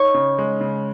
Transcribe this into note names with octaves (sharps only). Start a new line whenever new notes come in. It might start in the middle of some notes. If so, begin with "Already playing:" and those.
Already playing: D#4 C#5
C#3
G#3
C#3